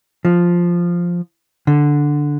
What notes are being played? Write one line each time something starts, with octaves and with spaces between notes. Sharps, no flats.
F3
D3